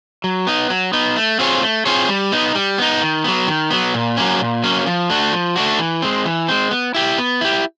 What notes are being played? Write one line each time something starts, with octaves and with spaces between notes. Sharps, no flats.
F#3
B3 D#4
F#3
B3 D#4
A3
C4 F4 G#4 C#5
A3
C4 F4 G#4 C#5
G3
B3 D#4
G3
B3 D#4
D#3
F#3 B3
D#3
F#3 B3
A#2
F#3 A#3 C#4
A#2
F#3 A#3 C#4
F3
A3 D4 F#4
F3
A3 D4 F#4
E3
G#3 C4
E3
G#3 C4
B3
E4 G4
B3
E4 G4